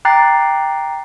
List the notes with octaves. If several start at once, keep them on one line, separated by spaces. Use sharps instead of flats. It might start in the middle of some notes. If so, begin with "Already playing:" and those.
G5 A#5 D6 F#6 A6 C7